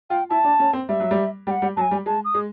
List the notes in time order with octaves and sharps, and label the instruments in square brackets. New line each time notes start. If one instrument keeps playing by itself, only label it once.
[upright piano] F4 [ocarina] G5
[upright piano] E4 [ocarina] A5
[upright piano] D4
C#4
C4
[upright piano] G3 [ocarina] E5
[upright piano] F#3
G3
[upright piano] G3 [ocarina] G5
[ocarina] F#5
[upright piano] G3
[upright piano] F#3 [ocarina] A5
[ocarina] G#5
[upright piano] G3
[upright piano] G#3 [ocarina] A5
[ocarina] D#6
[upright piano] G#3